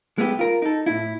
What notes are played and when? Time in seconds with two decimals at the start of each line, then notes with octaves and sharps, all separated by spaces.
0.18 G#3 A3 B3 F#4 G4
0.39 F4 A#4
0.62 D#4 A4
0.86 A2 E4